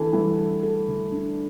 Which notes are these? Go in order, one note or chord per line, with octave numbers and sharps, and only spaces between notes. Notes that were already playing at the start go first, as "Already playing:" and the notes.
Already playing: D3 E3 A4
E3 G3
A4
A4
D3
D4